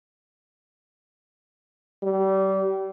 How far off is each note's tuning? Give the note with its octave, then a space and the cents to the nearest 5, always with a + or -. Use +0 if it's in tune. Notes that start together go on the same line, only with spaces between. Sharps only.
G3 -30